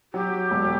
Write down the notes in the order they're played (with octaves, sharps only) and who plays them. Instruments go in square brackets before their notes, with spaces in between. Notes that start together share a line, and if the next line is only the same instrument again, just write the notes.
[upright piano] F#3 [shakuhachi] G4
[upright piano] E1